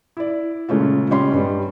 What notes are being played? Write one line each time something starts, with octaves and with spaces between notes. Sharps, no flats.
E4 D5
A#2 C#3 G#3 A3 C#4 F4
C#3 G3 C#4 D#5 B5 C6
G2 G3